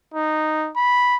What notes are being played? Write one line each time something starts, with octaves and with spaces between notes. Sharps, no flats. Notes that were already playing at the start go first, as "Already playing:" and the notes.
D#4
B5